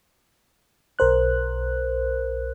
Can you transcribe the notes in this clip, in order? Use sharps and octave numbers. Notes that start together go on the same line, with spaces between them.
B1 A#4 C5 F#6